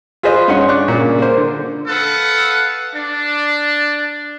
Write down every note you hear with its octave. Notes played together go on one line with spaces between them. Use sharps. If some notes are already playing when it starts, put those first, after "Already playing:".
F4 G#4 B4 C5 D#5
G2 C#4 D#4 F#5 C6
D4 C#6 F#6
A#2 C#3
A#3 C5
D3
A4 B4 F5 F#5
D4